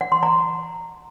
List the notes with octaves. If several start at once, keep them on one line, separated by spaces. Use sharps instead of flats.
F#5
C6
A#5